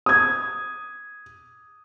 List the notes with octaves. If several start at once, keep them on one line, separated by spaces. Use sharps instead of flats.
D#6 G#6